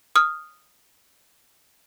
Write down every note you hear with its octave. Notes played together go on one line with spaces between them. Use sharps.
D#6 F6